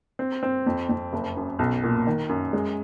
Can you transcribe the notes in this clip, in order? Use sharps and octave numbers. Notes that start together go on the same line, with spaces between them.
C4
C4
F2
F2
F#1
F#2
B1
A#2
D#3
F#2
G#3